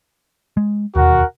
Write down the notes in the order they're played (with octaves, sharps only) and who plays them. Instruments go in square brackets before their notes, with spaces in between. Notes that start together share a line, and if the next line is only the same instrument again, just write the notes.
[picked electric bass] G#3
[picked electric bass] E1 D#2 [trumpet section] F#4 A#4 F#5